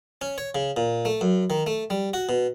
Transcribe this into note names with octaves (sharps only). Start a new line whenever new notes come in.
C#4
C#5
C#3
A#2
A3
F#2
D#3
A3
G3
F#4
B2